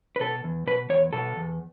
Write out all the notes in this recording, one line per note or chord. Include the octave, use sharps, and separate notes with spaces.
B4
B2 A4
E2
B2 B4
E2 C#5
B2 A4
E2